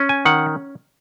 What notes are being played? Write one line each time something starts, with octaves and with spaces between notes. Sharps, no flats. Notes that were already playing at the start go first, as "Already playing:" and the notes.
Already playing: C#4
G#5
D#3 F#5